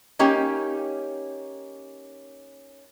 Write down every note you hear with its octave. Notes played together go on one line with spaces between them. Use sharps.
A#3 C#4 D#4 G4